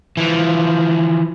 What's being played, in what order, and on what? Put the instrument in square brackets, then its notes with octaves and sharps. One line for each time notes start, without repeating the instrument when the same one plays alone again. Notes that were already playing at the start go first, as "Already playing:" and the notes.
[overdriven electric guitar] E3 F3